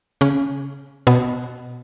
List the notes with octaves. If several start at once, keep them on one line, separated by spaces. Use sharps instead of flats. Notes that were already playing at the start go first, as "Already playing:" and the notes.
C#3 C#4
B2 B3